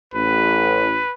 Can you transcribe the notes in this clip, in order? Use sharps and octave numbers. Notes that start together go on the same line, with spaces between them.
A1 B4